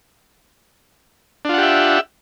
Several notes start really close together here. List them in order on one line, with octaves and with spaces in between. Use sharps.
D4 F4 F#5 G4 E5